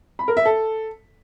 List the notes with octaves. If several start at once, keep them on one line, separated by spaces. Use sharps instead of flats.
B5
A#4
E5
A4